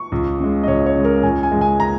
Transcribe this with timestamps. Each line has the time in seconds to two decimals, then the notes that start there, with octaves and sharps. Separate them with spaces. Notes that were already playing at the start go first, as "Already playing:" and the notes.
Already playing: C#6
0.12 C#2
0.40 C#3 G#3
0.63 D#5
0.67 C#2 C#5
0.86 C#5
0.96 C#3 G#3
1.05 A#4
1.23 C#2 G#5
1.43 G#5
1.52 C#3 G#3
1.61 G#5
1.80 A#5